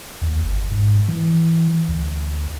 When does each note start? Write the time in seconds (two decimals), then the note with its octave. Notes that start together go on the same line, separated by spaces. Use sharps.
0.22 D#2
0.43 G1
0.71 G#2
1.08 E3
1.88 D2